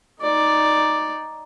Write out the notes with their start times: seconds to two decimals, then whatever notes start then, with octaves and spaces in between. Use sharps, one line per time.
0.22 D#4 D5